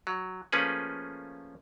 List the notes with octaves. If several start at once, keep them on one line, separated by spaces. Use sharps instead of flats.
F#3
F3 A3 A#3 C#4 G#4 B4